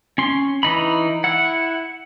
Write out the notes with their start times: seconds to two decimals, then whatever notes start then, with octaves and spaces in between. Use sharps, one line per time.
0.18 C#4 C6
0.63 E3 D#4 B5
1.24 E4 F#5